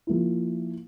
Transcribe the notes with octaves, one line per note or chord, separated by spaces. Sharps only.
F3 A#3 E4